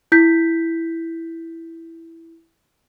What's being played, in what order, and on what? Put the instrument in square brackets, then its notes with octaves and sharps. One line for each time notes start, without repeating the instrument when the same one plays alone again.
[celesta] E4 G6 B6